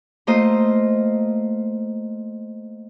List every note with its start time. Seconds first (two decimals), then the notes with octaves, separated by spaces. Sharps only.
0.27 A3 A#3 F4 C5 D#5